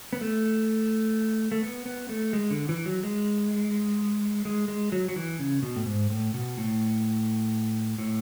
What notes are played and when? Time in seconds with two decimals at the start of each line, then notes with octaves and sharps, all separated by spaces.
0.13 B3
0.21 A3
1.52 A3
1.62 B3
1.86 B3
2.09 A3
2.33 G#3
2.51 D3
2.69 E3
2.86 F#3
3.03 G#3
4.45 G#3
4.68 G#3
4.92 F#3
5.08 F#3
5.16 E3
5.39 C#3
5.63 B2
5.76 A2
5.86 G#2
6.10 A2
6.34 B2
6.57 A2
7.98 A2